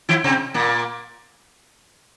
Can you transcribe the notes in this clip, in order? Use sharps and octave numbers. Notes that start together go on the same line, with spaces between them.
E3 E4
C3 C4
A#2 A#3